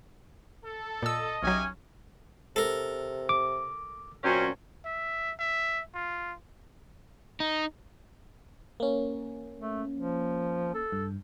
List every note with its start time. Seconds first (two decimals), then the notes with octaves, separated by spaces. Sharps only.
0.64 A4
1.03 A#2 D#5 E6
1.43 B1 F#3 C#4 G4 E5 G#5
2.56 C3 A4 A#4
3.29 D6
4.24 A#2 F#3 C4 C#4
4.85 E5
5.39 E5
5.95 F4
7.40 D#4
8.80 A#3 C#4
9.60 A3
9.96 F3
10.75 A4
10.92 G2